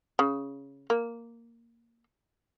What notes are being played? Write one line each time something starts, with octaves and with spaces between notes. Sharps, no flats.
C#3
A#3